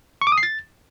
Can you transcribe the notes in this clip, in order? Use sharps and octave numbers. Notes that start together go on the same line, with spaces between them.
C#6
D6
D#6
C7
A6